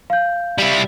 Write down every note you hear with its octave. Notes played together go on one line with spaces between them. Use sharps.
F5 G6
G3 E4